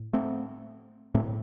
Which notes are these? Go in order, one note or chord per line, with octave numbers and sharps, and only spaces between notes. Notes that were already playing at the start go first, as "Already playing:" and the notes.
Already playing: A2
A3 C4
A2 A3 C4